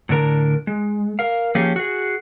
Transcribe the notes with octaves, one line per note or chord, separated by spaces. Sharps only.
A2 D3 D4 A#4 A#5
G#3
A#4 F5
F3 A#3 C#4 G4 G#4
F#4 G#4